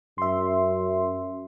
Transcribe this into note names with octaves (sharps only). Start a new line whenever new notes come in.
F#2 E5 C6